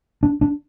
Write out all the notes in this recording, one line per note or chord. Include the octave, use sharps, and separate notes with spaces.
D4
D4